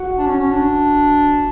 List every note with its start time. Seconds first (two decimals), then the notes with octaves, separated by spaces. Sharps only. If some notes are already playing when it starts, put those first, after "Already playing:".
Already playing: F#4
0.18 D4
0.27 C#4
0.40 C#4
0.53 D4